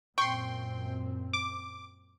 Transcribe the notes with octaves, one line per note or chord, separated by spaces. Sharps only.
F#2 A#2 C4 G5 C6 C#6
D6